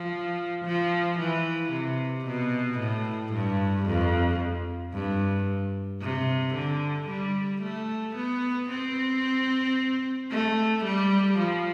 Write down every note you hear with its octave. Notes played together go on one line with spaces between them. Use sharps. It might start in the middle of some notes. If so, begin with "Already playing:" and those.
Already playing: F3
F3
E3
C3
B2
A2
G2
F2
G2
C3
D3
G3
A3
B3
C4
A3
G3
F3